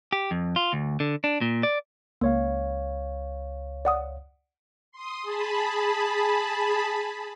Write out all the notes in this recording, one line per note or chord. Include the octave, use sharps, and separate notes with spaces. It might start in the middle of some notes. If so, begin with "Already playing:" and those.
G4
F2
F4
D2
D3
D4
A#2
D5
C#2 A#3 C#5 F5
D5 F#5 D#6
C6 D#6
G#4 A5 B5